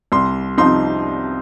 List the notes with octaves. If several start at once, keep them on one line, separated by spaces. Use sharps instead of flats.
C2 C6
C3 F3 C4 D#4 C6